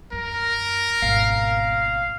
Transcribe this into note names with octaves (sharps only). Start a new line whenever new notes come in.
F#2 A#4
G#1 B2 F5